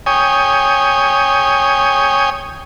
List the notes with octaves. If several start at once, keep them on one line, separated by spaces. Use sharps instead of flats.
C#5 G5 G#5 D#6